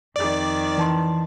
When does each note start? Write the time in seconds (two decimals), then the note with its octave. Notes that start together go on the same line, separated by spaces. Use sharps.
0.16 F2 D#3 D5
0.78 E3 A5 C6